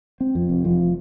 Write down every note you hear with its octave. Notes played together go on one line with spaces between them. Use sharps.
C4
F2
F1
F3